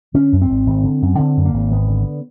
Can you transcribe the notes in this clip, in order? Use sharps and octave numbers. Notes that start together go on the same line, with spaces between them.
D3 C#4
F#2
C4
G#1
G#1
D3
F#2
D3 C4
F#2
A#3
G#1
G#1 B3
D3